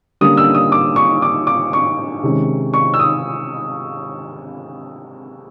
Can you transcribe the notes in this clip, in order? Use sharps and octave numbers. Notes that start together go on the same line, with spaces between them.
D3 G3 A#3 C#4 D#6
E6
D#6
D6
C#6
D6
D6
C#6
C3 D#3 G#3 C#4
C#6
E6
D#6